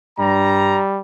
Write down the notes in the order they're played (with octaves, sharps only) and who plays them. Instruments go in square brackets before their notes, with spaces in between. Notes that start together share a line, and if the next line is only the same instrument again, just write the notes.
[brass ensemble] G2 A#5 [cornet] G3